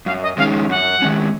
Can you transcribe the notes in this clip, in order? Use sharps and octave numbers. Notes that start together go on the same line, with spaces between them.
F#2 F5
D#5
D#3 G#3 C#4 F5
F#2 F#5
D#3 G#3 C#4